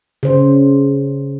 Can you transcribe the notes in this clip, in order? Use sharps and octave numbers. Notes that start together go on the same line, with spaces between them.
C#3 C5